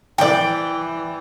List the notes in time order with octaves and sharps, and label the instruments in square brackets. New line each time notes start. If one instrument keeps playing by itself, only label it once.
[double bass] E3 [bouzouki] D5 G5